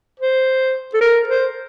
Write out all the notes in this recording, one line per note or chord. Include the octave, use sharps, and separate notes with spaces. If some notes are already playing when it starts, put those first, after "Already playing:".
C5
A4
A#4
C5